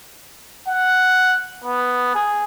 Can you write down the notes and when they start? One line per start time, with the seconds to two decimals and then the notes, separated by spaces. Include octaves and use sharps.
0.68 F#5
1.64 B3
2.15 G#4